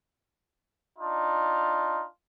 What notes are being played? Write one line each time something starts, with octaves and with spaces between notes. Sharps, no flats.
D4 D#4 F4